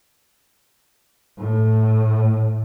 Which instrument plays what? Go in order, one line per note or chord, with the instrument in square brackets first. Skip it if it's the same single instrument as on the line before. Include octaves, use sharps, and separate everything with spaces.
[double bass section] A2